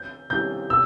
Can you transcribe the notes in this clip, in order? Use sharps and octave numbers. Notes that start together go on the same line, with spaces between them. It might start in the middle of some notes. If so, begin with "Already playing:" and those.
Already playing: G6
G3 C#4 E4 G4 G6
B2 E6